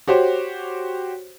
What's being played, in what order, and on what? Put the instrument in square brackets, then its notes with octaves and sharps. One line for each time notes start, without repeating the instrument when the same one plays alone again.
[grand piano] F#4 G4 C5 C#5